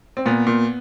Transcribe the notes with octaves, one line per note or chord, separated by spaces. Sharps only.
C4
A#2 B3
A#2